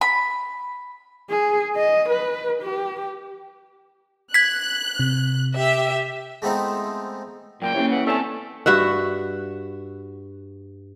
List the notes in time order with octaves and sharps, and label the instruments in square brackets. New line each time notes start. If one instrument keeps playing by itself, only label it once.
[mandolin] B5
[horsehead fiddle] G#4
D#5
B4
G4
[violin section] F#6 [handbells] G#6 B6
[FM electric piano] C3
[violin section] G4 E5
[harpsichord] G#3 A3 B3 C4 D#4 E4
[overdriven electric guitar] F#2 A#3 [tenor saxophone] A#2 [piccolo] G5
[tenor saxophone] C3 [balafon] A#3 C#4 E4 [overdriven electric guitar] G#4 C#5
[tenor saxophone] E3 [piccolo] F#5
[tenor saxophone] A3 [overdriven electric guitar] C4 C#4 [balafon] D5 G#5 [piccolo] A5
[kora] G2 F#4 E5 F#5